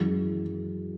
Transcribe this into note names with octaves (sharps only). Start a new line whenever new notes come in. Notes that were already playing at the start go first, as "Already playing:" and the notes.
Already playing: F#2 E3 G#3